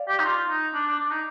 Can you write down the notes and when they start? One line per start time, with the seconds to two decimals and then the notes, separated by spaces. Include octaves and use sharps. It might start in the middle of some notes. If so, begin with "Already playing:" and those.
Already playing: D5 F5
0.08 G4
0.20 D#4
0.24 F4
0.49 D#4
0.74 D4
0.87 D4
0.99 D4
1.11 D#4